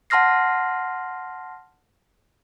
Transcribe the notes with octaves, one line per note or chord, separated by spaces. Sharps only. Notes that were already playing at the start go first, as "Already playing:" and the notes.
F#5 A5 C6 F6 A#6 C7